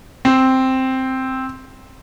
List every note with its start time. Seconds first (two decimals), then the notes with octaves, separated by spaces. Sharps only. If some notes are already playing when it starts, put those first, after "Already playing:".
0.25 C4